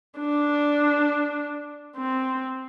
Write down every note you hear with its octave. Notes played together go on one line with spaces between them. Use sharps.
D4
C4